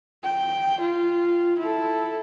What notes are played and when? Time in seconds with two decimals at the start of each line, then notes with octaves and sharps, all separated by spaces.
0.24 G5
0.81 F4
1.59 E4 A4